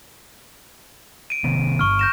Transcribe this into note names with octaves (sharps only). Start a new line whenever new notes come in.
D7 D#7
C3 D#3 B3
G1 C#6 F6
G6 A#6 E7